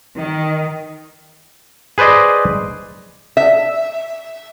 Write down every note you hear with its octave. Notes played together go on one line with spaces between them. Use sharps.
D#3
G#4 B4 C5 D5 D#5
E5